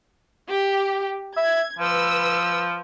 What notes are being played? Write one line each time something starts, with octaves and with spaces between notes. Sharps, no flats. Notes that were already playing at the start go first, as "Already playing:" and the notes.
G4
E5 G#6
F3 B4 E6